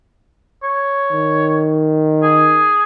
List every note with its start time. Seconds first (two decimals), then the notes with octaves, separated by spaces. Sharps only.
0.64 C#5
1.12 D#3
2.23 G#4